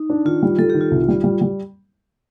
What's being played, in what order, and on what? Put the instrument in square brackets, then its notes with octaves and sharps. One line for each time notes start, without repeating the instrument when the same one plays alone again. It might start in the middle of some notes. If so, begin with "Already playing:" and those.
Already playing: [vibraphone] D#4
[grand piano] D4
[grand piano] D#3 [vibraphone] F4
[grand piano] G3
[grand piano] G3 [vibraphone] A4
[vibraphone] G4
[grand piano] D#3
[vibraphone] F4
[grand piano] C2
G3
G3
G3